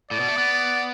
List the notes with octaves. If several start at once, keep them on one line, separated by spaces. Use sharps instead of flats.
A2 D5
B2
A3
B3